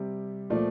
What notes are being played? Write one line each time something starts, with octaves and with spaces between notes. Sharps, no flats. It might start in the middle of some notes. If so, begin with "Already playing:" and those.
Already playing: C3 G3
A#2 F3 A3 D5